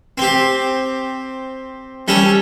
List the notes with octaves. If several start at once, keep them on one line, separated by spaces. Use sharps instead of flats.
C4 G4
G3 C#4 A4